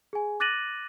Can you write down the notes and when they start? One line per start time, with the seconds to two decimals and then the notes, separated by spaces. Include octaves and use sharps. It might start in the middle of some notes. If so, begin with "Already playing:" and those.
0.13 G#4 G#5
0.40 D6 F#6 A6 A#6 D#7 F#7